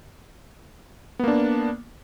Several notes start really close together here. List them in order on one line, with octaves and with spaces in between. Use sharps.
B3 A#3 D4